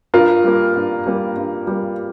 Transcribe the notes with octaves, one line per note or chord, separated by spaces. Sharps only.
G2 F4 A#4
G3 A#3
G2
G3 A#3
G2
G3 A#3